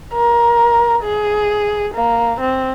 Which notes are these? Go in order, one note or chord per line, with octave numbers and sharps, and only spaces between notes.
A#4
G#4
A#3
C4